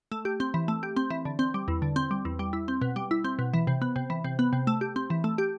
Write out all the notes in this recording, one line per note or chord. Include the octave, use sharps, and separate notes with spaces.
A3
G4
C4
E3
A3
G4
C4
E3
D3
C4
G3
E2
D3
C4
G3
E2
G3
E4
C4
B2
G3
E4
C4
B2
E3
C3
B3
C3
E3
C3
B3
C3
A3
G4
C4
E3
A3
G4